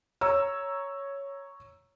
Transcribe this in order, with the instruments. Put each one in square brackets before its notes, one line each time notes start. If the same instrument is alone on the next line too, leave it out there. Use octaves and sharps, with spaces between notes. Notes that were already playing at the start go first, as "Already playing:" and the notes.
[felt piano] C#5 A#5 E6